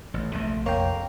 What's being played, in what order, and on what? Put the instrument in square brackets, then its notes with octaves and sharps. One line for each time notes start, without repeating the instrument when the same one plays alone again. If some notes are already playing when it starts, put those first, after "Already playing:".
[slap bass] A1
[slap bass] A#1 C3 [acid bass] A3
[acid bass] F2 [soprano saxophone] A#3 [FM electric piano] C#5 G5